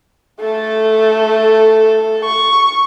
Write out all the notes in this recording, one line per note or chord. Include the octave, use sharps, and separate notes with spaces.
A3 A4
C#6